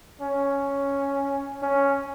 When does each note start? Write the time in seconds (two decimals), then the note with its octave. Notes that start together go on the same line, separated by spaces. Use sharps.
0.21 C#4
1.62 C#4